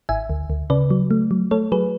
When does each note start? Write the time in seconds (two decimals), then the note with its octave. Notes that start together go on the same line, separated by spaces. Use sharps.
0.09 G#1 E5 G#5
0.30 D2
0.50 D2
0.70 C#3 B4 D5
0.91 F#3
1.11 A3
1.31 F#3
1.51 A3 A4 C#5
1.72 F#3 G#4 B4